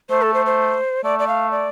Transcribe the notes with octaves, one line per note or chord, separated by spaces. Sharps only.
A3 C5
A4
C5
C5
A3 D5
D5
F5
D5